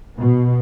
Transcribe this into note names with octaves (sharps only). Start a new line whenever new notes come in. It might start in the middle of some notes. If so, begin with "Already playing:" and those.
B2